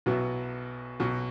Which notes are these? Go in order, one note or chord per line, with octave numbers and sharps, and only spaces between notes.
B1 B2 F#3 B3 E4
B1 B2 F#3